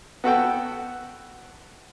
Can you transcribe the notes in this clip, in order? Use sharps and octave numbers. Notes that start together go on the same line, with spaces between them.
B3 F#4 A4 G5